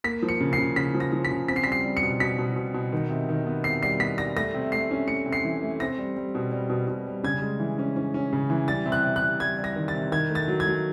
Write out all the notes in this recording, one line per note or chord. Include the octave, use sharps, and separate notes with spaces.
A#3 B6
F3
C#7
C#3
C7
C#3
C#3 B6
F3
A#6
F3
B6
C#3
C4 B6
C7
G3 B6
C7
G3
C#7
B2
B2 B6
B2
B2
B2
D#3
C3
D#3
B3
C3 C7
G3 C7
B3 B6
G3 A#6
A3 A#6
C3
A3 C7
C#4
A3 C#7
C3
C7
E3
A3
C4 A#6
G3
G3
B2
G3
B2
B2
G3
C#3 G#6
G#3
E3
C#4
C#4
C#4
C#3
E3
G3 A6
C3
F#6
C3
F#6
C3
G3 G#6
G3
A#6
D#3
A6
C3
D#3 G#6
A3
A6
F#3
G#6
F#3